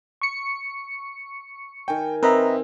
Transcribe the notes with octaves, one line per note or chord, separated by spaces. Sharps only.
C#6 C#7
D#3 G5 G#5
C4 A#4 B4 D#5 E5 A#5